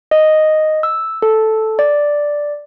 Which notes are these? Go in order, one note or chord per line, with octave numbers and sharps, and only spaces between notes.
D#5
E6
A4
D5